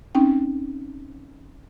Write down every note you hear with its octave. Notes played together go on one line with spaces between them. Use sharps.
C4 C#4 D#4 G5